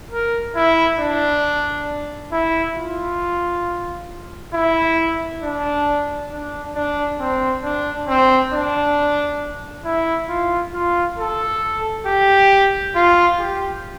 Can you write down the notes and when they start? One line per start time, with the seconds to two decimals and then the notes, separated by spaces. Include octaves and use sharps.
0.11 A#4
0.56 E4
0.99 D4
2.32 E4
2.77 F4
4.54 E4
5.42 D4
6.31 D4
6.75 D4
7.20 C4
7.64 D4
8.08 C4
8.52 D4
9.85 E4
10.29 F4
10.74 F4
11.18 A4
12.06 G4
12.95 F4
13.40 G4